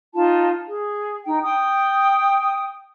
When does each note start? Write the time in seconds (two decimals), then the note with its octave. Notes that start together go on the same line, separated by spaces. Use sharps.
0.13 D#4 F4 A5
0.66 G#4
1.25 D#4 G5
1.42 G5 D#6